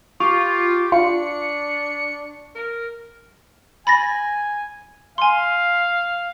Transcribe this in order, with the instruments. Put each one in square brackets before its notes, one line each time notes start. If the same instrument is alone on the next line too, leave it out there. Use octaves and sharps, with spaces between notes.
[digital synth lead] F4 [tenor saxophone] G4 [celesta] C#6
[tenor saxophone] D4 [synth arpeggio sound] F4 [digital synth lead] C#7
[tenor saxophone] A#4
[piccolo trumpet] G#5 [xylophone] B5 A6 A#6
[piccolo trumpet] F5 [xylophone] G#5 C6